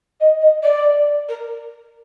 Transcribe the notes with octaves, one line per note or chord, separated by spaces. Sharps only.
D#5
D#5
D5
A#4